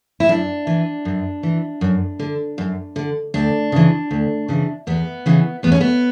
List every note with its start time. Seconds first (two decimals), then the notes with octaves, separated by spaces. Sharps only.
0.20 E4
0.28 F#2 D4
0.67 E3
1.05 F#2
1.43 E3
1.81 F#2
2.19 D3
2.58 F#2
2.96 D3
3.34 D2 D4
3.72 C#3 E3
4.11 D2
4.49 C#3 E3
4.87 E2 B3
5.26 C#3 E3
5.63 E2 B3
5.72 C#4
5.81 B3